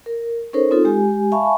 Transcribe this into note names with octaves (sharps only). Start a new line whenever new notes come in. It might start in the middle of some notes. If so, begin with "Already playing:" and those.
A#4
C#4 D#4 A4 A#4 C5 C#5
C4 D#4 F4 A4
G#3 G4 G#5
E5 F5 G#5 A5 B5 C#6